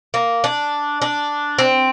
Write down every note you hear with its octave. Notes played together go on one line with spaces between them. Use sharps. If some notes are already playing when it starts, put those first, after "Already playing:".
A#3
D4
D4
C4